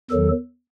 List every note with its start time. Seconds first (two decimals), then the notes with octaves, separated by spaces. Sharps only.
0.10 E2 D#3 F#3 A4